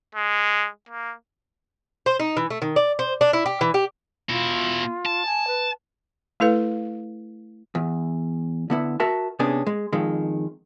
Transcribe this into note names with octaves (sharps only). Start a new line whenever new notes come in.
G#3
A#3
C5
D#4
E3
A3
D#3
D5
C5
D4
E4
G4
E3
G4
B2 E4 F4
A5
G#5
B4
A3 E4 A4 B4 F5
E2
D3 B3 E4
F#4 A#4 E5 A5
C3 B3 C#4 D4 G#4
G#3
F2 D#3 G#3